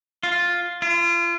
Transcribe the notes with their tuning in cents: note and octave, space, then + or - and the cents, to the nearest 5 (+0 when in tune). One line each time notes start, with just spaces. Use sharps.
F4 +5
F4 -35